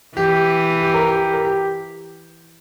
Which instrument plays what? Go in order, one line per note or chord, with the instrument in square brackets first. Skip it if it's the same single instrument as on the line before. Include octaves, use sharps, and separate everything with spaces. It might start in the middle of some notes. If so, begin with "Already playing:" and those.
[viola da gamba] E3 [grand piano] G4
[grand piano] G4
A#4
G4
A#4
G4